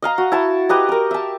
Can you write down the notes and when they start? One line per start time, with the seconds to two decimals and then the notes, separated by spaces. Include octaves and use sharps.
0.02 D#5 F5 A#5
0.18 F#4
0.32 E4 A5 C#6
0.69 G4 B4 D#5 A#5
0.89 A#4 A#5
1.11 E5 A5